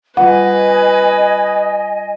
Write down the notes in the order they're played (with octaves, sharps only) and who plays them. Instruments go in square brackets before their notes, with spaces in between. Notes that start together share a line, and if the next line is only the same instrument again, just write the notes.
[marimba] G3 F4 [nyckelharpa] B4 [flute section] D#5 G#5 [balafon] F#5